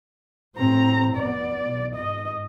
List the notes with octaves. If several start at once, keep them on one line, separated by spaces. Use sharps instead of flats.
A2 C4 A#5
F1 B3 D5
B1
G#2 D#5